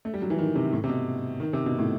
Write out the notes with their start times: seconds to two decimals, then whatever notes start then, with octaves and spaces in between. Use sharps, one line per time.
0.05 A3
0.14 G3
0.22 F#3
0.30 E3
0.39 D#3
0.56 C3
0.73 A2
0.84 C3
0.89 B2
1.40 D#3
1.53 C3
1.66 B2
1.79 A2